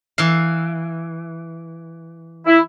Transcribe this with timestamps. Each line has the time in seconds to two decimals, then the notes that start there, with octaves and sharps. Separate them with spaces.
0.18 E3 F5
2.46 E4